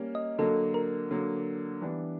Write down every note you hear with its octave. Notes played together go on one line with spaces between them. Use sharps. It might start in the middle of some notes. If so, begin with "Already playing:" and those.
Already playing: G3 A#3 C#4
D#5
D3 F#3 A#3 A4
A#4
D3 F#3 A#3
E3 G3 B3 D4